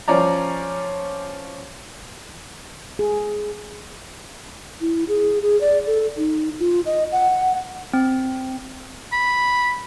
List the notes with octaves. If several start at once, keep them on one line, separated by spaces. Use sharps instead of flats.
F3 C#4 D5 A#5
G#4
E4
G#4
G#4
D5
A4
D#4
F4
D#5
F#5
C4
B5